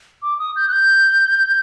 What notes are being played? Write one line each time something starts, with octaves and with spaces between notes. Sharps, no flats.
D6
D#6
G6
F#6
G6